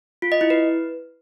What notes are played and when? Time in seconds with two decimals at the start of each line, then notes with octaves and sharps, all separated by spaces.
0.22 F4
0.32 D#5
0.41 E4
0.50 B4